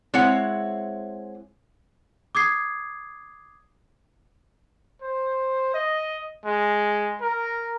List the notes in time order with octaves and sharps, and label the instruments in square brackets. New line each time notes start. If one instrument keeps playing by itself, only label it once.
[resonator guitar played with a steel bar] G#3 C4 E4 C#5 F#5
[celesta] D6 D#6 G#6 C7
[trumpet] C5
D#5
G#3
A#4